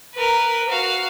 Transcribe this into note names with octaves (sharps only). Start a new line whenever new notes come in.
A#4 B4
F#4 F5